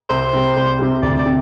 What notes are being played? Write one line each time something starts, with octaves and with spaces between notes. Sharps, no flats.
C2 C5
C3 G3
C2
C3 G3
D2 D5
D5
C3